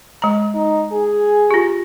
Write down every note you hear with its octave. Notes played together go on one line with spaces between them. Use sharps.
G#3 A#5
D#4
G#4
F4 G4